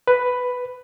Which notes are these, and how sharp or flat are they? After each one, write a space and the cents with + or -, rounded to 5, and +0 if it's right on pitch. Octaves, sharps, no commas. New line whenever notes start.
B4 +5